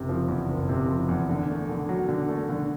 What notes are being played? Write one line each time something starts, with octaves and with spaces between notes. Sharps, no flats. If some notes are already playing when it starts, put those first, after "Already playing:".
Already playing: F#1 C3
F3
E2
F#1
C3
F3
E2
D3
A3
D3
F#3
D3
A3
D3